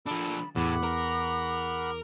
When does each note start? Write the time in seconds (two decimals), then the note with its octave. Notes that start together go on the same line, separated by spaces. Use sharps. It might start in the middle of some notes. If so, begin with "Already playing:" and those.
0.06 F3 D4 A4 B5
0.56 E2 A2 F#5 B5 D6
0.83 A#4